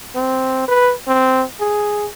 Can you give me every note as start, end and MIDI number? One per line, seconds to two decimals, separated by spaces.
0.15 0.64 60
0.68 0.92 71
1.07 1.43 60
1.60 2.07 68